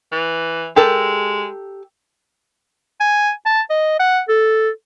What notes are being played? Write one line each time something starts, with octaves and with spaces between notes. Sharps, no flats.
E3
G#3 G4 A4 A#4
G#5
A5
D#5
F#5
A4